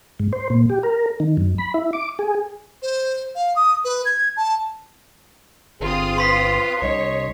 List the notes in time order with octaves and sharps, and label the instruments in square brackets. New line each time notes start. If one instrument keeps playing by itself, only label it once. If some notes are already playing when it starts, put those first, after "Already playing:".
[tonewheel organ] G#2
C5
A#2
G4
A#4
D#3
F#2
B5
E4
D6
G#4
[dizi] C5
F5
D#6
B4
G#6
A5
[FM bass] G1 [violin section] C4 F4 D#6 [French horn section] G#4
[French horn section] B4 [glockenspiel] C6 B6 C7
[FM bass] C2 [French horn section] D4 D#5 [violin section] C#5